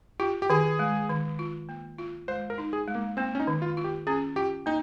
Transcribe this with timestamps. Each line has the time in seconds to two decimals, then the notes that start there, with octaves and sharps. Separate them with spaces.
0.20 F4 G4
0.42 G4
0.50 D#3 G#4
0.79 G#3
1.09 D#3
1.39 F4
1.69 A#3
1.98 F4
2.28 G#3 C5
2.50 A#4
2.58 D#4
2.73 G#4
2.88 G#3
2.95 A#3
3.17 A#3 C4
3.35 C#4
3.40 D#4
3.47 D#3
3.62 F4
3.77 F4
3.84 G4
4.07 C#4 G#4
4.36 F4 G4
4.66 A#3 D#4